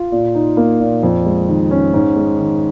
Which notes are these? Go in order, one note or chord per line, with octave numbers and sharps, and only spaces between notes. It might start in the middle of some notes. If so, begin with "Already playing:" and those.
Already playing: F4
A#2
D#4
A#3
A#2
F2
G#3
D#3
C#4
G#2
G#3
D#3